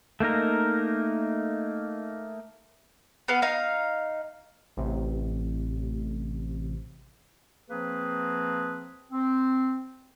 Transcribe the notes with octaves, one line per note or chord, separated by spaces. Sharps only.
A3 A#3 D#4 A#4
B3 F5
D#4 F5
A1 C3
F3 A#3 C4 G#4 B4
C4